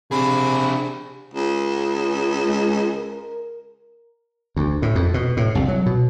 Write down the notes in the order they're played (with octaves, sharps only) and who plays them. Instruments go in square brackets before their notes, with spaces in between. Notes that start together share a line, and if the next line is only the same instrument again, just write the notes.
[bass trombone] C3 [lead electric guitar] D4 G#4 [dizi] B5
[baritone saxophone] C#2
[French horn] G#3
A#4
[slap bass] D2
A2
F2
B2
A2
C2
F#3
B2